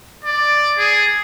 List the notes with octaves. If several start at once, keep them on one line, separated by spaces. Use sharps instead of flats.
D5
G#4